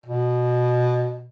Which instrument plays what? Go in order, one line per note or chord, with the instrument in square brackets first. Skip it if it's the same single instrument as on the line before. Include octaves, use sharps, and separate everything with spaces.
[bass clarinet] B2